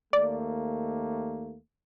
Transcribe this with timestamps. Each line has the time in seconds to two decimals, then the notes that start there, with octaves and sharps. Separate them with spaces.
0.13 D#2 A3 A#3 D5